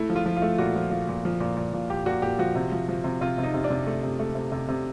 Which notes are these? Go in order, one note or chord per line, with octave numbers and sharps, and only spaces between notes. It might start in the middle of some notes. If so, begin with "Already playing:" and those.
Already playing: A3 E4
F3
F4
F3
F4
A3
A#2 F#4
F3
F3
A#2
F3
A#2
A#2
A#2
A#2 G4
A#2 F#4
A#2 G4
F3 F#4
C3
F3
F3
C3
C3 F4
C3
D#4
C3
D4
C3
A3
C3
A3
C3
C3
C3